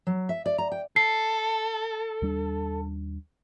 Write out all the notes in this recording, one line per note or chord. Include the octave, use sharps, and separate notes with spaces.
F#3
E5
D5
A#5
G5
A4 C7
D#2 G3 D4